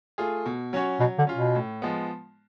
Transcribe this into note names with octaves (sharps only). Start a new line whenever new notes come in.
A3 F4 G#4
B2
F#3 C#4 F#4 C#5
B2 F#3
D3
C#4 F4
B2
A2
F3 G#3 B3